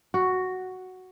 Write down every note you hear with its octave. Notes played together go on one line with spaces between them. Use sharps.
F#4